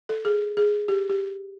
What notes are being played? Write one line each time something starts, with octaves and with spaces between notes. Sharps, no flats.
A4
G#4
G#4
G4
G4